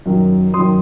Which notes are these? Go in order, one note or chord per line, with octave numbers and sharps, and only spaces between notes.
F#2 D#3
F#2 D#3 C6 D#6